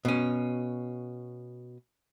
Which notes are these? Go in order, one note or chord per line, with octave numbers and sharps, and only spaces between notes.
B2 C#4